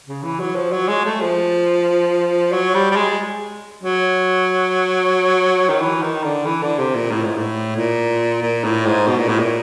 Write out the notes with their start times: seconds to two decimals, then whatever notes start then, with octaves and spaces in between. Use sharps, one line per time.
0.07 C#3
0.23 E3
0.40 F#3
0.56 F3
0.72 F#3
0.88 G#3
1.05 A3
1.22 F3
2.52 F#3
2.75 G3
2.91 G3
2.96 G#3
3.84 F#3
5.70 D#3
5.81 E3
6.02 D#3
6.24 D3
6.46 E3
6.62 D3
6.79 C3
6.95 A#2
7.11 A2
7.24 G#2
7.37 A2
7.76 A#2
8.42 A#2
8.64 A2
8.86 G#2
9.08 B2
9.19 A#2
9.29 A2
9.39 A#2